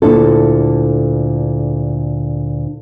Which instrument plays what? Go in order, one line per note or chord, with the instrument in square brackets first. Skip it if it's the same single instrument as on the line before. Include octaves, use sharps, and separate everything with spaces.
[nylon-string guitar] D2 A#2 D4 E4 A4